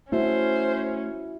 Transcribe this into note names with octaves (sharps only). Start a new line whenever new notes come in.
A3 C#4 E4 F#4 C5 E5